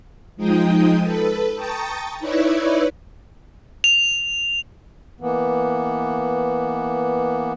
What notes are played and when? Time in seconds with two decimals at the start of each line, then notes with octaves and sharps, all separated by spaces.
0.37 F3 G#3 D#4 G5 D#6
1.02 A4 B4
1.55 G5 A5 A#5 C#6 D#6 A6
2.19 D#4 E4 B4 C#5 D5 E5
3.84 F7
5.21 E3 A#3 B3